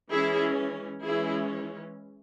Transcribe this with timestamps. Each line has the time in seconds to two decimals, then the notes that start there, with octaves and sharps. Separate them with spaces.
0.11 E3 G#3 C#4 E4 G#4
1.03 E3 G#3 C#4 E4 G#4